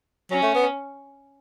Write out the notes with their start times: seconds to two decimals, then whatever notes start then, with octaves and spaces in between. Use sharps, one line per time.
0.31 F#3 C#4
0.43 A3
0.55 B3